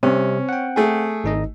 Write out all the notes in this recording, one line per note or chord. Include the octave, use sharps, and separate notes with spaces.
C3 G3 C4 C#4
F#5 G5
A3 G#4
G#1 D#4 D#5